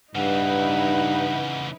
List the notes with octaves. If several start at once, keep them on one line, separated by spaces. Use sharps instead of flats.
G2 C#3 E3 D#4 E4 B4 F#5